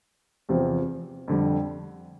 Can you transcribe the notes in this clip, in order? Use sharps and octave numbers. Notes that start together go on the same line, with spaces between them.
E2 C3 F3 C4
F2 D3 G3